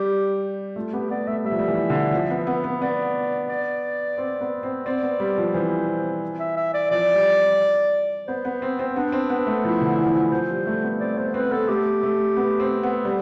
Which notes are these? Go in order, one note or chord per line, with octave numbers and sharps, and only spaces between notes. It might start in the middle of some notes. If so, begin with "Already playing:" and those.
Already playing: G3 G4
A3 F4
B3 G4
B3 D5
A3 E5
G3 E5
F3
G3
E3
D3
F3
B3
B3
B3
B3 D5
D5
C4
B3
C4
C4 D5
B3
G3
F3
E3 C5
E5
E5
D5
F3 D5
G3
B3 C5
B3
C4
C4
B3 D4
C4
B3
A3
F3 E4
D3
E3
F3
F3 C5
G3
A3
B3
C4 D5
B3 C5
C4 B4
B3 A4
A3 G4
A3
B3
C4
B3
G3 A4